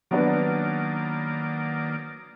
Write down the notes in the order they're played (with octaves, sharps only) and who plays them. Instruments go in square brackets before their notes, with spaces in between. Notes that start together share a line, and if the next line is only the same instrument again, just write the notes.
[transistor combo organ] D#3 A#3 D5 [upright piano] F#3 B3 D4